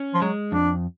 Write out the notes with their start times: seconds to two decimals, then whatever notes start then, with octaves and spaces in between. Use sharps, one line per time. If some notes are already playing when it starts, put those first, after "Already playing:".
Already playing: C#4
0.14 F3
0.22 F#3 G#3
0.52 F2 D4